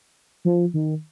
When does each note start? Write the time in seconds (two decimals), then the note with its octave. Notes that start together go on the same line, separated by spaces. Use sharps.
0.45 F3
0.74 D#3